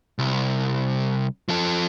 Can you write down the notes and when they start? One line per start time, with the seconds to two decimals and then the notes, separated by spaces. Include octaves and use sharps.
0.19 C2
1.49 F3 A4